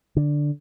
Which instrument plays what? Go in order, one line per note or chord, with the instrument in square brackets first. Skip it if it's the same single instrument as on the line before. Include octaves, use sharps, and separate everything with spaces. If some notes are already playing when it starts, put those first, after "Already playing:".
[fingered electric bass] D3